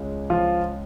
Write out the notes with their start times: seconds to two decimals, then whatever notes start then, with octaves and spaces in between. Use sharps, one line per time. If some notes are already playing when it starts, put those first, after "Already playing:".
Already playing: C#2 C#3 G#3
0.30 F3 F4